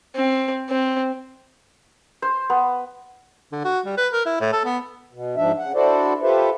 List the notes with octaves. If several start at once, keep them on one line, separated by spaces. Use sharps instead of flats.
C4
C4
C5
B3
D3
F#4
G3
B4
A#4
E4
A2
A4
B3
B2
G#2 F3 D4 E5
C#3 F#5
D4 E4 F#4 A4 C5 D5
F4 G4 A4 B4 C5 E5